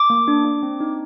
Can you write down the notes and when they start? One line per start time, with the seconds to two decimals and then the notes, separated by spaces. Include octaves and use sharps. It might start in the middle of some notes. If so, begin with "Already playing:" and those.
Already playing: D6
0.10 A#3
0.28 D4
0.45 D4
0.63 C4
0.80 D#4